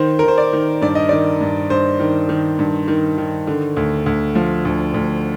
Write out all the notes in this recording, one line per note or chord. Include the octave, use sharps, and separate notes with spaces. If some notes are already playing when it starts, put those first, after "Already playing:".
Already playing: D#3 C5
D#3 A#4
C5
D5
D#3
G2 D5
D#5
D#3 D5
G2
G2 C5
D#3
D#3
G2
D#3
D#3
D3
D2
D2
F3
D2
D2